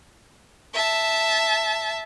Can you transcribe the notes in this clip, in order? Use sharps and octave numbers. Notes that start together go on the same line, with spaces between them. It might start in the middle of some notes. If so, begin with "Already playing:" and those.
E5 A5